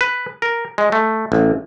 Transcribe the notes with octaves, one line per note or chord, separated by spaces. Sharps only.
B4
A#4
G#3
A3
A1